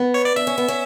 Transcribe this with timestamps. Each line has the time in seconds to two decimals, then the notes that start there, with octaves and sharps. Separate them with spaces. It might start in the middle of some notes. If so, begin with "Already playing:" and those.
Already playing: B3
0.14 C#5
0.25 D5
0.36 D4 E5
0.47 C#4
0.58 B3
0.68 C#4